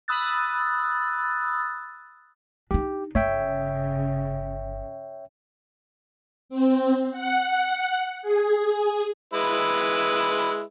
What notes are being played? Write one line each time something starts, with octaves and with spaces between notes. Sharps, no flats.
B5 D#6 E6 F#6 A6
D4 D#4 G4
G1 C#3 C#5 E5 G5
C4
F#5
G#4
G#3 E4 B4